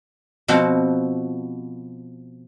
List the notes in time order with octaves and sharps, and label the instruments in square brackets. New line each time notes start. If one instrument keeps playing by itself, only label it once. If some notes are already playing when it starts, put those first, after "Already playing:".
[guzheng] B2 F3 C4 F#4